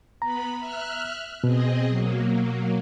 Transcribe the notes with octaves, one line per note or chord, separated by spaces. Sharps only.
B3 A#5 B5
E5 F6 F#6
B2 C4 G#4 D#5
F#3 A#3